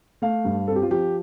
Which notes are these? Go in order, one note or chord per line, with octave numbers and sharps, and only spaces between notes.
A3 F5
G2
C4 A4
G4
F4
F3 G4